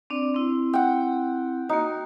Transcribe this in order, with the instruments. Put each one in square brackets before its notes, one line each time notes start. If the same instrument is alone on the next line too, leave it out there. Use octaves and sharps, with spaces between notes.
[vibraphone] C4 D4 D5
C4 E4
[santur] F#5 G5
[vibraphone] A#3 F#4 [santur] D#4